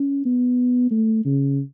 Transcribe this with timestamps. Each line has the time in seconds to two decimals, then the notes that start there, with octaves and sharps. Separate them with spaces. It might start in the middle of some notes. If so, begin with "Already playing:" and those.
Already playing: C#4
0.25 B3
0.91 A3
1.25 C#3